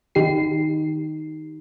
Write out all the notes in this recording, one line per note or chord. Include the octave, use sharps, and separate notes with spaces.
D#3 D#4 G4 C7